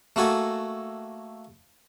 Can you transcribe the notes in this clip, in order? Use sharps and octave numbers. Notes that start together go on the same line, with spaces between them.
A3 A#3 F#4 A4 G#5